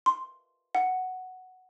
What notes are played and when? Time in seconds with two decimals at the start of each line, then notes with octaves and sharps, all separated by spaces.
0.06 C6
0.75 F#5